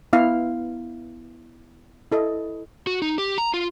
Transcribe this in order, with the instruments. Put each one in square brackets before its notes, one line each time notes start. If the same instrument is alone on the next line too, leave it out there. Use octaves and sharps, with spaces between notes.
[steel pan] B3 E4 F5
E4 A4 D#5
[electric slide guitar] F#4
D#4
G4
A#5
F4